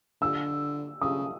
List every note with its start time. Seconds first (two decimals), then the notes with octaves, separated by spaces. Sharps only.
0.21 D3 E6
1.01 C#3 D#6